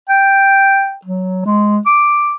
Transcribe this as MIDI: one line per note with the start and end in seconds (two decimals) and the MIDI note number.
0.09 0.95 79
1.05 1.41 54
1.45 1.79 56
1.86 2.35 86